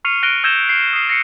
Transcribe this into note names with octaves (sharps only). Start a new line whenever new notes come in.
C#6 F6 C7 C#7 D#7 F7
F6 F#6 A#6 D7 D#7 G7
E6 G6 G#6 A#6 E7 G7
C7
D#6 C7
A#6 C7 C#7